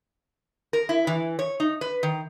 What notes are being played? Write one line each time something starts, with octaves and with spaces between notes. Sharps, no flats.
A#4
E4
E3
C#5
D#4
B4
D#3